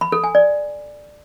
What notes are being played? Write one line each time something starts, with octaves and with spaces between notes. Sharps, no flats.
B5
A4
G#5
D5